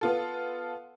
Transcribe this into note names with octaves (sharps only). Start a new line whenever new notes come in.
B3 F4 A4